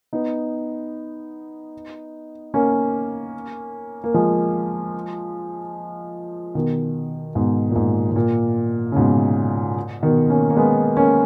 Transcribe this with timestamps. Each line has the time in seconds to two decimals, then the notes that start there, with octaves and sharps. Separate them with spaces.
0.13 B3 D#4
2.54 A#3 C#4
4.04 A#3
4.14 F3 G#3
6.55 B2 D#3
7.35 G#2 B2
7.70 A#2
7.76 G#2
8.12 G#2
8.16 A#2
8.92 C#3
8.96 G#2 B2
10.03 B2 D#3
10.30 A#3 C#4
10.50 A#3
10.56 G#3 B3
10.97 A#3 C#4